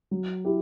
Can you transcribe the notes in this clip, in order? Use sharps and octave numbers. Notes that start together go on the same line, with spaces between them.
F#3
E4 G4